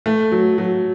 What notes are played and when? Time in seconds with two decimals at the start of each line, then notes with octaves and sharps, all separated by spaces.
0.06 A3
0.32 F#3
0.58 F#3